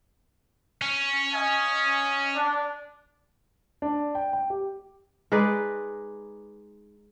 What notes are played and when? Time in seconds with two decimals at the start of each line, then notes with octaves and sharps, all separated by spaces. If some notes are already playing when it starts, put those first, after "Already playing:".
0.82 C#4
1.33 D#5 F5 G#5
2.35 D4
3.82 D4
4.15 G5
4.33 G5
4.50 G4
5.32 G#3 D#4 B4 D5